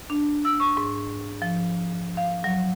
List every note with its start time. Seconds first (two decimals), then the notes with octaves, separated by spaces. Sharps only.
0.10 D4
0.45 E6
0.60 C#6
0.77 G#2
1.42 F3
2.17 F5
2.44 F#3